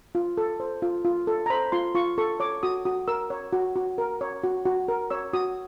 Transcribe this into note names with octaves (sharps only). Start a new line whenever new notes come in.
F4
A4
C5
F4
F4
A4
A#5
C5 B5
F4 C6
F4 C#6
A4 C#6
C#5 D6
F#4 D#6
F#4 D#6
A#4 E6
C#5
F#4
F#4
A#4
C#5
F#4
F#4
A#4
C#5 E6
F#4 D#6